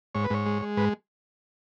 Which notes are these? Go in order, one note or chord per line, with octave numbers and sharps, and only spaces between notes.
G#2 C#5
B4
G#2 C#5
G#3
G#3
G#2 B4